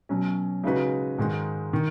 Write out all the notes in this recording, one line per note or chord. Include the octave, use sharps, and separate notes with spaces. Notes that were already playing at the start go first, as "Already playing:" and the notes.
B2 F#3 C#4
C#3 G#3 D#4 F#4 B4
G#2 D#3 G#3
D#3